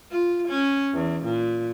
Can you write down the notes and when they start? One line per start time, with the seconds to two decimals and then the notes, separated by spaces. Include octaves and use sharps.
0.11 F4
0.48 C#4
0.93 E2
1.24 A#2